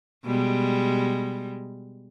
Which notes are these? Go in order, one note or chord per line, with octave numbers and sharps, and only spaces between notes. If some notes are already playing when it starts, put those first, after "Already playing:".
B2 G3 G#3